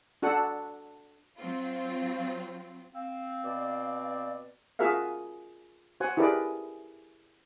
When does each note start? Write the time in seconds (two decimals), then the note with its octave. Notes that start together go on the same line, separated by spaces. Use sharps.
0.22 D4 F#4 A4 F#5
1.38 F#3 C4 F4
2.95 C4 F5
3.44 B2 D5
4.79 F4 F#4 G#4 A#4 E5 F5
6.00 F#4 C5 F#5 G#5
6.17 E4 G4 G#4 A#4 B4 D5